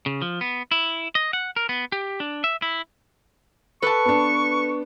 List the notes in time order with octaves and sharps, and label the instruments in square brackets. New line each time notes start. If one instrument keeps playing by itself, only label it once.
[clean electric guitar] C#3
F3
B3
E4
D#5
F#5
A#4
B3
G4
D4
E5
E4
[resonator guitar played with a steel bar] A4 A5 [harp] B4 [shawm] C#6
[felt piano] B3 D4